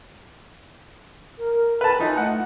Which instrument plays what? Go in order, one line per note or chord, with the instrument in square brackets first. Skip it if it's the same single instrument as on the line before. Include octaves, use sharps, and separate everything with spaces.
[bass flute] A#4
[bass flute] A4 [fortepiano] B4 A5
[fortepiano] E3 D#4 [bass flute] F4
[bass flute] A3 [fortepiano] F#5